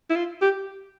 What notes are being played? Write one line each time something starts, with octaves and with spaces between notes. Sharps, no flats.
E4
F4
G4